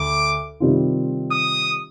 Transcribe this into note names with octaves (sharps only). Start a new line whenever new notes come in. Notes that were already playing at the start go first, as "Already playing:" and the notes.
Already playing: D2 D6
C3 D#3 G3 C4 F4
D#6